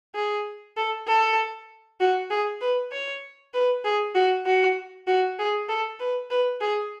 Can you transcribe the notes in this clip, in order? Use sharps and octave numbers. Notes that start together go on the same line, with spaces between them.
G#4
A4
A4
F#4
G#4
B4
C#5
B4
G#4
F#4
F#4
F#4
G#4
A4
B4
B4
G#4